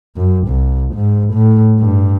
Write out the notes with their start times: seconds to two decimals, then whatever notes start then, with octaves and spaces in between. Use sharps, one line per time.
0.17 F#2
0.48 C2
0.95 G#2
1.34 A2
1.79 G2